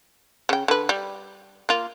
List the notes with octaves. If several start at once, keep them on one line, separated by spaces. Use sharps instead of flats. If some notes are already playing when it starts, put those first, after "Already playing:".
C#3 G5
D3 B4
G3
A#3 F4